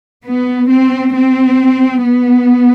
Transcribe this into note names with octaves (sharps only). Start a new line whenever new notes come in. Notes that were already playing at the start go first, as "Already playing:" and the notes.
B3
C4
C4
B3